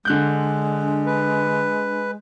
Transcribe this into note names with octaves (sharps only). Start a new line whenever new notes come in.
D3 G#3 D4 F#6 G6
B4